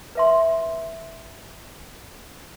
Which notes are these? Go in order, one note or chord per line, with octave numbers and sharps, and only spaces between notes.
B4 E5 C6